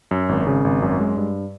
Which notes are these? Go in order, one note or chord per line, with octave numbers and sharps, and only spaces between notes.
F#2
G#1
C#3
G#1
F#2
G#3
G2